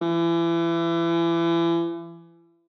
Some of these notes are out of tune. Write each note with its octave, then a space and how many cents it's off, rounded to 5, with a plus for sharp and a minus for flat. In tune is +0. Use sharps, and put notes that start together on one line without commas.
E3 +30